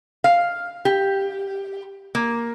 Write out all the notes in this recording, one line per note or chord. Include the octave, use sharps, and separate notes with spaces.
F5
G4
A#3